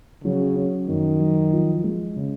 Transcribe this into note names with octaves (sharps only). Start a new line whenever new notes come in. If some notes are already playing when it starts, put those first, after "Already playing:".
C#3 F#3
C#4
F#2 D#3
F#3
F3
G#3
C#3